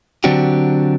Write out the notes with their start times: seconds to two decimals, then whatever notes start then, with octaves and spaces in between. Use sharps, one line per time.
0.24 D3 F#3 C4 D4 F#4 G4